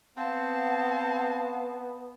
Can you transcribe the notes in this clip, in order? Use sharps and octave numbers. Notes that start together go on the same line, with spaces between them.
B3 C4 F5 F#5 A5